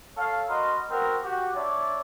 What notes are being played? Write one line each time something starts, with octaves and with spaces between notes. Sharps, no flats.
A4 C#5 F5
F#4 A#4 D#5 B5 C6
B3 C4 F#4 A#4
F#4 G4
D4 E4 C#5 D5